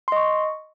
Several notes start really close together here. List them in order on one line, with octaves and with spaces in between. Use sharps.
C6 D#5 C#6